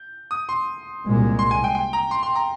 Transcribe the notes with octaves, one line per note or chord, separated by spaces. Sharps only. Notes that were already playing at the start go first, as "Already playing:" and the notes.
Already playing: G6
D#6
C6
C2 A#2 G#3
C6
G#5
G5
G5
A#5
C6
C6
A#5